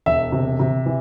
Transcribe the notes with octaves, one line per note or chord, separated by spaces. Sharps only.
E1 E5
C3
C3
E3